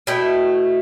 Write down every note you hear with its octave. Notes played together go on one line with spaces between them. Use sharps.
B2 A3 E4 G5